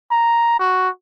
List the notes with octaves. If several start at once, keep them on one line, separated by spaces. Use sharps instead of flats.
A#5
F#4